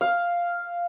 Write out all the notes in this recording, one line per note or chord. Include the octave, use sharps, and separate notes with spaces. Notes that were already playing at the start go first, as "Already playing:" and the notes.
F5